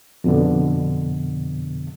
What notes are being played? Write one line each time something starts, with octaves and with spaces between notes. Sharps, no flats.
F2 B2 D3